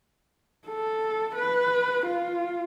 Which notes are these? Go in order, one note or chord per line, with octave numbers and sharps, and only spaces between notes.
A4
B4
F4